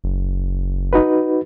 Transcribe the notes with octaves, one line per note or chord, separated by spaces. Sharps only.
F#1
D#4 F#4 B4